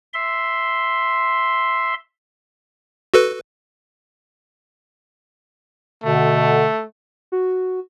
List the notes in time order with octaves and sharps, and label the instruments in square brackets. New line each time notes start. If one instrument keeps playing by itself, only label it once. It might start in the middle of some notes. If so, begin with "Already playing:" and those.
[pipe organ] E5 C6
[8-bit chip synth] F#4 A4 B4
[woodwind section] B2 D3 [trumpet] A3
[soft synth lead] F#4